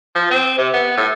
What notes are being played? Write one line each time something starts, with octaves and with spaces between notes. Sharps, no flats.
F3
C4
C3
B3
A2